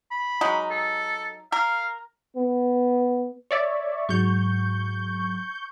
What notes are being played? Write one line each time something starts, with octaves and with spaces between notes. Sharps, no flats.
B5
F#3 G#3 D#4
A4
A#4 F5
B3
C#5 D5 E5
G#2 F#3 C#6 G6